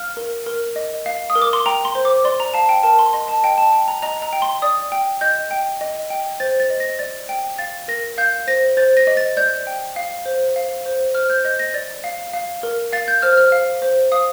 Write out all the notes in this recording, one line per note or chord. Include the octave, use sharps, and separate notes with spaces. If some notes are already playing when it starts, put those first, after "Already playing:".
Already playing: F5 F6
A#4
A#4
D#5
F5
D#6
A#4
D6
C6
G5 A#5
C6
C5
D6
D5 C6
A#5
F5 A5
G5
A#4 A5
C6
D#5 C6
A5
D#5 G5
A5
G5
A#5
D#5 A#5
A#5
G5
C6
D5 D#6
G5
D#5 G6
G5
D#5
G5
C5 A6
A6
D#5
A#6
D5 A6
G5
F5 A6
A#4 A#6
F5 G6
C5 A#6
C5 A6
A#6
D#5
A6
D5 G6
G5
F5
C5
F5
C5
C5 F6
G6
D#5 G6
A#6
D5 A6
F5
F5
A#4
F5 A6
G6
C5 F6
F6
F5
C5
F5 D#6